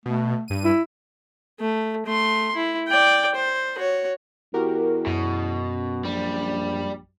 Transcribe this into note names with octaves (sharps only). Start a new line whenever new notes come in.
B2 A3
G2 D#7
E4
A3
A3 C6
E4
D5 G5
C5
F#4 C#5
E2 F#4 G4 A#4
F#2 B2
A#1 G3